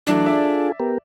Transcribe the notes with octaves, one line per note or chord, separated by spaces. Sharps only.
E3 F#3 A3 D4
F4 G#4 A4 D5 E5
B3 G4 A#4